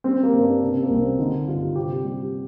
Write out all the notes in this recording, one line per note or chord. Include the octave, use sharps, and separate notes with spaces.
G3 C4
A#3
G2
D4
C3 D4
C4
A#3
C2 C4
D3 D#4
G2 F4
C3 G4
G3